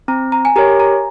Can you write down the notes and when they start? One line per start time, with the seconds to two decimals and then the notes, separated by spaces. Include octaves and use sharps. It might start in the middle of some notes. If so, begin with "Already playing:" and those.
0.08 C4 A#5
0.32 A#5
0.45 G#5
0.56 G4 A#4 C#5 A#5
0.80 A#5